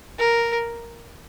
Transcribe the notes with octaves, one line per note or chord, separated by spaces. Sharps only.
A#4